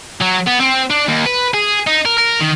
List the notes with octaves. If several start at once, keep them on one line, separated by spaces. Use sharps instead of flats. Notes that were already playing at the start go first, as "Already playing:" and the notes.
F#3
B3
C4
D4
D#2
B4
G#4
D#4
A#4
A#4
D#3